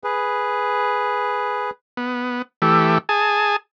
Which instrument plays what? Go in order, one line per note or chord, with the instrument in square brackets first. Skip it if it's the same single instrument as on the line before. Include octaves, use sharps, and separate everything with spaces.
[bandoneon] G#4 B4
[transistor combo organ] B3
E3 A3 G4
G#4 G#5 A5